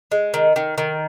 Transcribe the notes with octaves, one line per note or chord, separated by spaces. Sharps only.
G#3
D#3
D#3
D#3